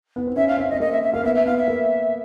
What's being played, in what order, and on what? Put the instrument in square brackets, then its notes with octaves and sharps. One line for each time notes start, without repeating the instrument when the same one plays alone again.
[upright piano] B3
C4
[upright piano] C#4 [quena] E5
[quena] F5
[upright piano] C4 [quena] E5
[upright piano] C#4
[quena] D#5
[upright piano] C4
[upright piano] A#3 [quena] D#5
[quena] E5
E5
[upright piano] A#3 [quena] F5
[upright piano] B3 [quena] E5
[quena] E5
[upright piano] B3 [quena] F5
[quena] E5
[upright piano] A#3